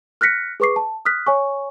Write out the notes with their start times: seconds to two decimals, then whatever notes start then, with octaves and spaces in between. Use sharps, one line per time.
0.21 F6 F#6 A#6 B6 C#7
0.60 G#4 B4 C#6 D6 C7
0.76 A5
1.05 D#6 F6 F#6 B6
1.27 C#5 G#5 C#6